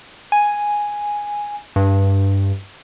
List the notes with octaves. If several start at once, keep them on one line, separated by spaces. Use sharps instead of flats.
G#5
G2